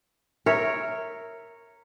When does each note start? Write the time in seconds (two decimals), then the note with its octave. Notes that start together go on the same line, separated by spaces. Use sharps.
0.46 A#4 C#5 E5